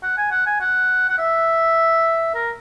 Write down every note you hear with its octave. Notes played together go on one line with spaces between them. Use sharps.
F#5
G#5
F#5
G#5
F#5
F#5
E5
A#4